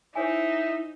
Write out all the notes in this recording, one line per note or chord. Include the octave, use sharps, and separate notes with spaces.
D#4 E4 C5 C#5 E5 G#5